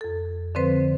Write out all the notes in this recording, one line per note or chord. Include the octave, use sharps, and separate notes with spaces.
F2 A4
D3 F3 C4 B4 C5